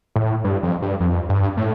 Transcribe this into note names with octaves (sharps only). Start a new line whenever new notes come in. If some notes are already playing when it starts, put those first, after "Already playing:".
A2
G2
F2
G2
F2
G2
A2